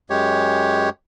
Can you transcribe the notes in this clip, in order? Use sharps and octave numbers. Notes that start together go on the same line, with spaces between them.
F#2 G#3 G4 C#5